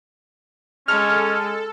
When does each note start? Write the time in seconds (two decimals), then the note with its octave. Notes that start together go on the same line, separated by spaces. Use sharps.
0.88 G#3 C#4 A4 F6